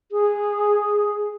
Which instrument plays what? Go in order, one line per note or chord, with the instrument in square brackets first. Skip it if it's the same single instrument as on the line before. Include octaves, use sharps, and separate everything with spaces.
[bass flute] G#4